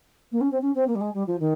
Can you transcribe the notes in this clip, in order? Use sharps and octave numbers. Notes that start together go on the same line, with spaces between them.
A#3
C#4
C4
C#4
C4
A#3
G3
G#3
G3
F3
D#3